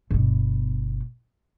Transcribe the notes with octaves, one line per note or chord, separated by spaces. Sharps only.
G1 B2